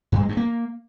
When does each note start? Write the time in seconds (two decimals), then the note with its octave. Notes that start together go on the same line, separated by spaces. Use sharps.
0.12 G2
0.20 G#3
0.29 G2
0.37 A#3